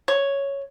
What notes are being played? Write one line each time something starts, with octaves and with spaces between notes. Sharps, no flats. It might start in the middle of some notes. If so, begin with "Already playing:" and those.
C#5